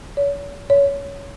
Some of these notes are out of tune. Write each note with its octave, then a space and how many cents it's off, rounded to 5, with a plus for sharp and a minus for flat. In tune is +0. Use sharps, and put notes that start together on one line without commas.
C#5 +40
C#5 +15